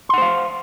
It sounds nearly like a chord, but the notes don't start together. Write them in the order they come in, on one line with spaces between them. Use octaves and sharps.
C6 F#5 C5 F5